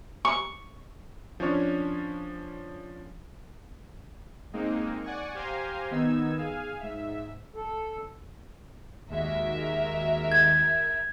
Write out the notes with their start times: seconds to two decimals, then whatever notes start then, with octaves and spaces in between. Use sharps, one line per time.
0.25 C#6
1.40 F3 C#4 D4 C#5
4.53 G#3 A#3 C4 D#4
5.04 D5 F#5 G#5 C#6
5.34 G4 C5 F5 G#5 A#5 C6
5.91 D#3 B3 D#4 E6 G#6
6.38 G#4 F5 G#5
6.80 G#2 E5
7.56 A4
9.10 D#2 G#3 F#4 A#4 E5
10.32 G#6